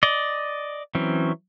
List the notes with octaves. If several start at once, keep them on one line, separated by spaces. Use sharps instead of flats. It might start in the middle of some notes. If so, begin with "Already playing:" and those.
D5 D#5
E3 F#3 C4 C#4